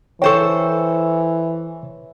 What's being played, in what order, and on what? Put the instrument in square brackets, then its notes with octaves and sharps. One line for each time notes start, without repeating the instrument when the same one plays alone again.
[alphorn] E3 [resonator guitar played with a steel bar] A4 C5 G5 [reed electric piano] C#5 C#6